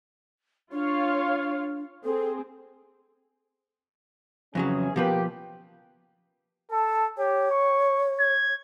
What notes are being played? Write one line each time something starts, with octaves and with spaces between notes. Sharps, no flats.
D4 F4 C#5 F5
C4 G#4 A4
F2 C#3 E3 F#3 C#4 G#4
B2 F3 A#3 G4 B4
A4 A5
G4 C#5
C#6
G#6